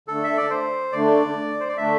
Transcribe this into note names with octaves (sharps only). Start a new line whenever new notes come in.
D3 A3 D4 A4
E5
D5
C5
D3 A3 D4 D5
C5
D5
D3 A3 D4 E5